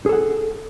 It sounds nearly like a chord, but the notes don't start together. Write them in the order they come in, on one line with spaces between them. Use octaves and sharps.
G#4 A4 F#5